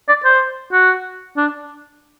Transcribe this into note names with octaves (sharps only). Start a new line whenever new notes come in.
D5
C5
F#4
D4